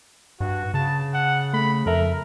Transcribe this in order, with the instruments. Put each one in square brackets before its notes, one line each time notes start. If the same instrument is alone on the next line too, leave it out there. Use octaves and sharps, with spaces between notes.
[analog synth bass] G2 [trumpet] F#4
[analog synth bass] C#3 [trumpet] A5
[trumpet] F#5
[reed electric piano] A3 [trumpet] B5
[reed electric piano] F2 A4 E5 [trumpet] A#4